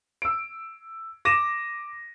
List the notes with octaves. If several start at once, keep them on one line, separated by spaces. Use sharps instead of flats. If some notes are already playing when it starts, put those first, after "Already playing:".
E6 D7
D6 A#6 D#7 E7